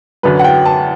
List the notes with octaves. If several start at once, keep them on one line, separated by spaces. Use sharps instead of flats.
F#2 D3 F#3 B4
F#5
G5
A5